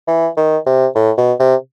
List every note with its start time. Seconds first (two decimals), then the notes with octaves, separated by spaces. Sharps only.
0.08 E3
0.37 D#3
0.66 C3
0.95 A2
1.18 B2
1.40 C3